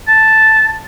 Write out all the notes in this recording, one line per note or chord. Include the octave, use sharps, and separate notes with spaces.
A5